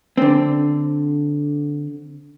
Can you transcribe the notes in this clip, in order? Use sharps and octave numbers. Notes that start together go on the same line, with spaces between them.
D3 C4